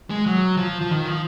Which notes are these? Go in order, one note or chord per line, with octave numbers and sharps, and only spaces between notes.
G#3
F#3
F3
F3
D#3
F3